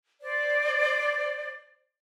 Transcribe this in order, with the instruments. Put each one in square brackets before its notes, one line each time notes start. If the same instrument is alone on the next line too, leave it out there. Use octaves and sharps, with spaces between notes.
[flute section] C5 D5